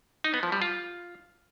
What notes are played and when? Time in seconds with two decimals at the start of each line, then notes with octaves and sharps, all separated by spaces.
0.24 D#4
0.34 B3
0.43 F3
0.52 G3
0.62 F4